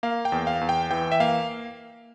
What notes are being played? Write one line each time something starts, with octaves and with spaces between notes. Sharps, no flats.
A#3 F5
G5
E2
F5
E2
G5
E3 G5
E5
A#3 F5